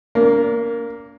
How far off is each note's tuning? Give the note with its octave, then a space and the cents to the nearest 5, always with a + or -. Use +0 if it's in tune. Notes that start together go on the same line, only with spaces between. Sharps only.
A#3 +0 D4 -45